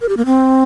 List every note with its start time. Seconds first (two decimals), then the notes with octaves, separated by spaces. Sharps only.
0.01 A#4
0.09 G4
0.17 A#3
0.26 C4